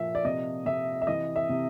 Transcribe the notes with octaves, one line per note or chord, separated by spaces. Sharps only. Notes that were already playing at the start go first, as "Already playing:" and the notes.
Already playing: A#2 F3 E5
D5
C3 D#5
C3 E5
E5
E3 D#5
E5
C3